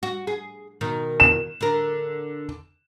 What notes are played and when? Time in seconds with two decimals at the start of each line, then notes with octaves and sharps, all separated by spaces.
0.03 F#4
0.27 G#4
0.81 B2 D#3
1.20 E7
1.61 D3 A#4